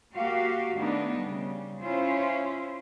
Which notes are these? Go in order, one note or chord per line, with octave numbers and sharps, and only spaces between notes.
A#3 F#4 G4 F5
D#3 A3 B3 D4 D#4
C#3 G3
C#4 E4 F4 C5